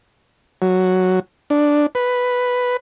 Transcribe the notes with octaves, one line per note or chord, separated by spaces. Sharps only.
F#3
D4
B4